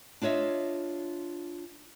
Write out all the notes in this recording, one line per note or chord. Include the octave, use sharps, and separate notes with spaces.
D4 F4 C#5 D#5 E5